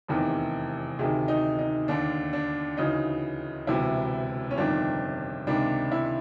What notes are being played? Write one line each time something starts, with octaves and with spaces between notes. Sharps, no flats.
F1 E2 C3 D#3
D2 C3 D#3 G#4
D#4
D#4
D#2 D3 D4
D4
D2 C#3 E3 D#4
E1 D2 C3 E3 E4
C#4
G1 F2 C3 D#3 D4
C#2 C3 D#3 D4
E4